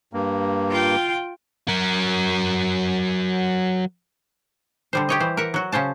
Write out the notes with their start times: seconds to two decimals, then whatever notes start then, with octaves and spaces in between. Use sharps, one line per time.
0.13 G2 A#3
0.71 F4 G5
1.68 F#3 A#4
4.93 D3 G3 C5
5.09 G4 C#5 D#5
5.20 E3 C5
5.37 A#4 E5 F#5
5.54 F#3 F#4
5.72 C#3 C#4 C5 A5